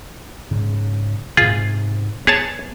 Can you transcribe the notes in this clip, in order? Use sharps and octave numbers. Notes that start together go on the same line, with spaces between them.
G#2 C#3
G#2 C3 F4 G#4
B3 G#4 C#5 A5